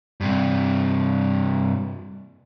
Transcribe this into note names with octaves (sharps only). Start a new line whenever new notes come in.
G2 C3